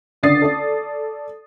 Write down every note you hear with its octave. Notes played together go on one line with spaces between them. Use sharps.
C#2 D3 D5 D#6 A6 C7
A4 D5